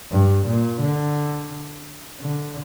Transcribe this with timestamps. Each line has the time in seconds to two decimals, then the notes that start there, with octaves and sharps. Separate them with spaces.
0.11 G2
0.46 A#2
0.81 D3
2.20 D3